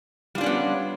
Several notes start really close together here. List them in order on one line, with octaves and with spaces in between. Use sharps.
G3 F4 D4 C#4 B3